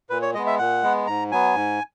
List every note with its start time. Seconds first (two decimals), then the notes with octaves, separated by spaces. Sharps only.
0.10 A#2 B4
0.22 C#5
0.34 G#3 B3 D#5
0.47 E5
0.59 A#2 F#5
0.83 G#3 B3
1.07 G#2 A#5
1.31 F#3 B3 G#5
1.55 G#2